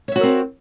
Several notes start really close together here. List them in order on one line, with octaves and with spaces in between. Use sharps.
C#5 E5 F#4 A#4 C4